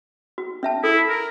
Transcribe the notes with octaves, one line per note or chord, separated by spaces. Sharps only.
F#4
C#4 E5 A5
E4 A4
A#4